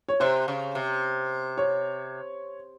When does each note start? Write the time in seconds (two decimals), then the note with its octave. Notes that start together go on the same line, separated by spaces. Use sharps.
0.09 C#5
0.20 C3 C5
0.48 C#3
0.75 C3
1.58 C#5